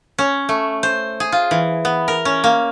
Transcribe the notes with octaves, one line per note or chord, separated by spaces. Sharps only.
C#4
A3
C5
G#4
F4
E3
B3
A#4
C#4
A#3